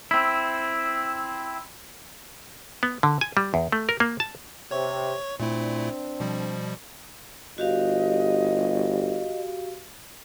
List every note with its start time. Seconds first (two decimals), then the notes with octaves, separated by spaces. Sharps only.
0.11 C4 E4
2.83 B3
3.03 D3
3.21 G#5
3.37 G3
3.54 E2
3.72 A3
3.89 A#4
4.00 A#3
4.20 A5
4.71 C3 C#5 C#6
5.40 A#2 A3 C4 D4 E4
6.20 B2 F3 G3
7.58 G1 F#4 G4 D#5 F5